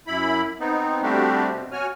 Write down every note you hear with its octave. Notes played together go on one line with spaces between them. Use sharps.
F#2 E4 B5
B3 C4 D#4
G3 A3 C4 D4 F#4 G4
B2
F#4 C#5 G#5 F6